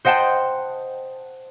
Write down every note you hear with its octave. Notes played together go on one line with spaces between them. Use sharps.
C5 D#5 F#5 G5 A5